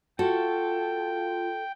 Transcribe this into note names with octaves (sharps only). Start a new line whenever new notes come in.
F4 F#4 A4 G5